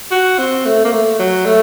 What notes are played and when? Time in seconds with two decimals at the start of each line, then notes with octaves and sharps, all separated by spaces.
0.11 F#4
0.39 C4
0.65 A3
0.84 A#3
0.92 A3
1.19 F#3
1.46 A3